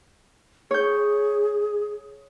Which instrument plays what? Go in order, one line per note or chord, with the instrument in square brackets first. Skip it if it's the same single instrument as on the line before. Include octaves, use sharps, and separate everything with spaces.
[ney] G#4 [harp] C#5 G6